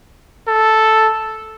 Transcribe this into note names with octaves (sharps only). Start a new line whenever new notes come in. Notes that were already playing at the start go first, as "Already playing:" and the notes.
A4